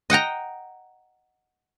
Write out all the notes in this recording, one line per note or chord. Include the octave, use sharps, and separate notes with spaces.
D#5 F#5 G5 A#5